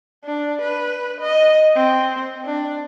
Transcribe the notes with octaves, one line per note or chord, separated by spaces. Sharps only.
D4
B4
D#5
C4
D4